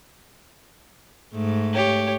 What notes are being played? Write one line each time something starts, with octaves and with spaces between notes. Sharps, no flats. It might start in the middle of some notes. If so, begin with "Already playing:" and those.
G#2 A3
G4 C#5